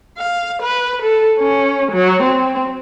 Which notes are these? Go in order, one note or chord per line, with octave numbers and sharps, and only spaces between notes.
F5
B4
A4
C#4
F#3
C4